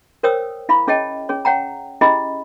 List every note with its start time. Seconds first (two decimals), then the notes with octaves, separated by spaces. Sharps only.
0.23 A#4 C5 C#5 G5 D#6 E6
0.69 E4 F5 B5 D6
0.87 C#4 G#4 C#5 D#5 G5 A5
1.29 C#4 G#4 C#5
1.45 C#5 F#5 G5 A#5
2.01 C#4 E4 G4 G#4 D#5 B5